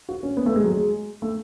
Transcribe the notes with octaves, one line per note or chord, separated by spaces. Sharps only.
F#4
C#4
B3
A3
G#3
F#3
G#3
A3